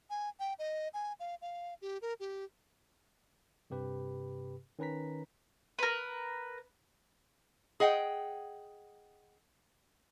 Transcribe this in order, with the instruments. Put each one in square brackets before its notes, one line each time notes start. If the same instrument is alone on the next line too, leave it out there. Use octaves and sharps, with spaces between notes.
[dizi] G#5
G5
D#5
G#5
F5
F5
G4
A#4
G4
[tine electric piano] G2 C3 G4 B4 B5
D#3 C#4 B4 A#5 B6
[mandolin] A#4 B4
[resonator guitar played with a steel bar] G#4 D#5 F#5 G5